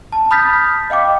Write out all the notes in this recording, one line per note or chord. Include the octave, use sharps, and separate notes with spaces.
A5
B5 D#6 F6 G6 A6 B6
D#5 F5 G5 D6